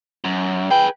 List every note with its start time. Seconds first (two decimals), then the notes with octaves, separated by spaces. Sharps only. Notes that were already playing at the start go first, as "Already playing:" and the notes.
0.24 F#2
0.71 G#4 B4 G5